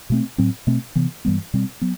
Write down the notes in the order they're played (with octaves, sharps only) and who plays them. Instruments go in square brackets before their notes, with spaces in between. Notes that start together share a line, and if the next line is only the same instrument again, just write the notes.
[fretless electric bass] B2 A3 C4
A2 F#3 C4
B2 A3 C4
C3 E3 B3
G2 E3 G3 B3
B2 G3 C4
F#3 B3